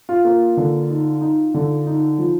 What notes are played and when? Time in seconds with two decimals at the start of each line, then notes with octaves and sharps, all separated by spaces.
0.09 F4
0.25 A#3 F4
0.57 D3
0.90 D#4
1.21 D#4
1.54 D3
1.87 D#4
2.18 F3